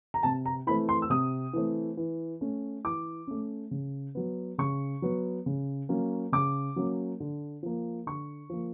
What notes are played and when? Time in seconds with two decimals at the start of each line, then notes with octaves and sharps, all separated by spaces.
0.14 A#5
0.23 C3 A5
0.46 A#5
0.67 E3 A3 C4 B5
0.89 C6
1.02 E6
1.10 C3 D#6
1.53 E3 A3 C4
1.97 E3
2.41 A3 C#4
2.84 E3 D6
3.27 A3 C#4
3.71 C#3
4.15 F#3 B3
4.58 C#3 C#6
5.02 F#3 B3
5.46 C#3
5.89 F#3 A#3 C#4
6.32 C#3 D6
6.76 F#3 A#3 C#4
7.20 D3
7.63 F3 A#3
8.06 D3 C#6
8.50 F3 A#3